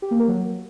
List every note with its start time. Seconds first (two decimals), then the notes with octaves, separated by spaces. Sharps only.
0.02 G4
0.11 A#3
0.19 A#4
0.28 F#3